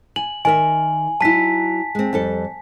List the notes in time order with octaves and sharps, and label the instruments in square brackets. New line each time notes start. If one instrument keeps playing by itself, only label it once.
[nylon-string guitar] G#5 [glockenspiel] F#7
[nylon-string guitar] D#3 A#4 E5 [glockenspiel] G#5
[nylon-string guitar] F#3 D#4 E4 [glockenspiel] A5 B6
[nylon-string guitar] G#3 C4
F2 G3 A4